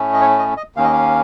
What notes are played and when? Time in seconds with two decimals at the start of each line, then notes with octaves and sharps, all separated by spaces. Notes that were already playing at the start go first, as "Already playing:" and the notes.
Already playing: A2 A3 C#4
0.13 D#5
0.21 C#5
0.39 D#5
0.57 D#5
0.76 D#2 D#3 A#3 C#4 F5
0.84 D#5
0.93 F5